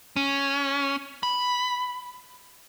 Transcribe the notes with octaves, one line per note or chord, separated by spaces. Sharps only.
C#4
B5